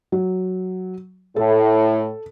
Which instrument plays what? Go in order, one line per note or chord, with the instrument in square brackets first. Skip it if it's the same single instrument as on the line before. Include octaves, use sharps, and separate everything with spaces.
[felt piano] F#3
[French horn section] A2 [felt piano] A4